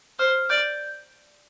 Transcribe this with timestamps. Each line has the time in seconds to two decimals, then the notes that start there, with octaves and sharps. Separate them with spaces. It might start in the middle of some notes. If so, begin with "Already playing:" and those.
0.19 C5 F6
0.50 D5 G6